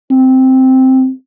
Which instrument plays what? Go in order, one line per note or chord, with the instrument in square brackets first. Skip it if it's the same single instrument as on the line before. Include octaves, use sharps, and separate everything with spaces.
[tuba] C4